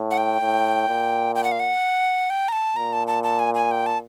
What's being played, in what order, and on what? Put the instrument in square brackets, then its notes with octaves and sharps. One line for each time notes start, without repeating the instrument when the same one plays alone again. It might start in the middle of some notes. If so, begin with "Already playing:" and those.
Already playing: [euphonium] A2
[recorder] F#5
G5
[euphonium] A2
A#2
[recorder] G5
F#5
F5
F#5
G5
A#5
A5
[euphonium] A#2 [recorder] A#5
[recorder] A5
A5
A5
G#5
G#5
G5
A5